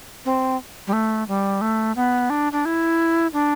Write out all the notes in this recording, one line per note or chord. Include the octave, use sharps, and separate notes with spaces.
C4
G3
A3
G3
A3
B3
D4
D4
E4
D4